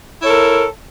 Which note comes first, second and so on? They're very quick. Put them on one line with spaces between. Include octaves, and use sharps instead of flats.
E4 C#5 A4 A#4